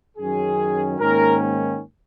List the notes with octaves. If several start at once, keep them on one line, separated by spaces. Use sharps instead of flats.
F#2 D#3 F#3 C#4 G#4
G#2 D#3 A#3 C#4 A#4